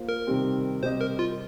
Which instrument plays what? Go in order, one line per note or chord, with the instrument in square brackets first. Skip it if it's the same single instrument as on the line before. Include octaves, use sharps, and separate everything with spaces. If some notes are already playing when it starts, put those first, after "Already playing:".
Already playing: [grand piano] A#3 F4 C5
[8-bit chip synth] A#4
[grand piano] C3 D#3 G3 C4
[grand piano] C3 G3 C4 G4 D#5 [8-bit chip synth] C5
[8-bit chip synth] A#4
F4